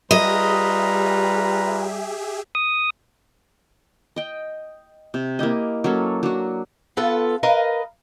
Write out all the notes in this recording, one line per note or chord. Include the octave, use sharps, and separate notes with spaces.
G3 F4 G4 G#4 B4 D#5 E5 A#5
D#6
D#5 G5
C3
A#3 E4 G4 D#5
F#3 A#3 C#4 A4
F#3 D4 F#4
B3 F4 A4
A#4 B4 D#5 F5